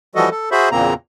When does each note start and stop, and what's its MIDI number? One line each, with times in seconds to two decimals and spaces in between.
0.15 0.29 52
0.15 0.29 53
0.15 0.29 55
0.15 0.29 66
0.15 0.29 69
0.15 0.29 75
0.31 0.49 69
0.51 0.69 66
0.51 0.69 68
0.51 0.69 72
0.51 0.69 76
0.51 0.69 83
0.71 0.94 40
0.71 0.94 46
0.71 0.94 49
0.71 0.94 58
0.71 0.94 60
0.71 0.94 82